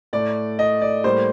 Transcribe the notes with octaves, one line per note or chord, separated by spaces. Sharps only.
A2 A3 D5
D#5
D5
A2 G3 A#3 C5